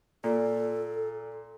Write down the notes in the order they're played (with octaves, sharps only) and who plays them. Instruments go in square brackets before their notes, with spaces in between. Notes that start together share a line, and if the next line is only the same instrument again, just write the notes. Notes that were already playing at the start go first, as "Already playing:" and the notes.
[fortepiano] A#2 [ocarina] A4